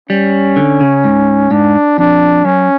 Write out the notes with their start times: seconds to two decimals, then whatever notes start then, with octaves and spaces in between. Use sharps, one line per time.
0.09 G3 C#4
0.56 D3
0.81 C#3
1.04 G#2
1.51 G#2 D4
1.98 F2 D4
2.45 F#2 C#4